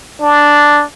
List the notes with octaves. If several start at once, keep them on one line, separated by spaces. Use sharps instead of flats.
D4